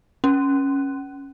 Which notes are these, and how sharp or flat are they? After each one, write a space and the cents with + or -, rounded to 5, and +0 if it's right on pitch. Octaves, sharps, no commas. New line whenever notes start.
C#4 -5